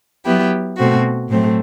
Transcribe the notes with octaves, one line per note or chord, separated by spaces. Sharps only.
F#3 B3 E4 G4
B2 A3 C4 F#4
A2 F#3 A3 C4